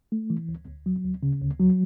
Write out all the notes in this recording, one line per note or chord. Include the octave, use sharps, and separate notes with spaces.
A3
E3
D2
D2
F#3
D2
C#3
D2
F#3